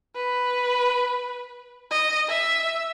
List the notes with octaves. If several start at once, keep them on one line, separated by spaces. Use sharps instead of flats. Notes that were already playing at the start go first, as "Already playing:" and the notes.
B4
D#5
E5